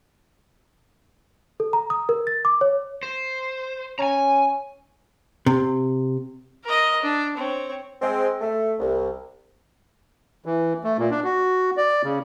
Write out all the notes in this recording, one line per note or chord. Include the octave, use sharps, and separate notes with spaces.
A4
A#5
D#6
A#4
A6
D6
C#5
C5
C#4 G#5 A#5
C3
A#4 D#5
D4
C4 C#5
G#3 C4
A3
C2
E3
A3
A#2
D4
F#4
D5
C#3